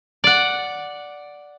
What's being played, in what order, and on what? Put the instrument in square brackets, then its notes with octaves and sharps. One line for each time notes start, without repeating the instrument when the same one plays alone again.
[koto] D5 F#5